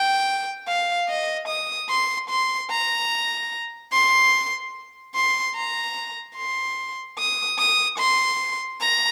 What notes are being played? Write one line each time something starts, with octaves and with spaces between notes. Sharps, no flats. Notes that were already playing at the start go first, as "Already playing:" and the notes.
Already playing: G5
F5
D#5
D#6
C6
C6
A#5
C6
C6
A#5
C6
D#6
D#6
C6
A#5